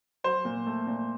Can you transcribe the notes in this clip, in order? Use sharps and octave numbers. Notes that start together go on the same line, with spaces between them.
F#3 C5
A#2
A3
A#2